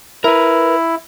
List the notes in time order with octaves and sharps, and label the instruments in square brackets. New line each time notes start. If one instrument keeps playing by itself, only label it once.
[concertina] E4 [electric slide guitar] A#4 B4